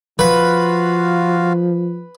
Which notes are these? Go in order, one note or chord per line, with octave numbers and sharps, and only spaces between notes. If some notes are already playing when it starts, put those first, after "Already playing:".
F3 F4 F#4 B4 F5